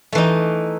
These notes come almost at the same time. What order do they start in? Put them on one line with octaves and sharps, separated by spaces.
A3 E3 D#4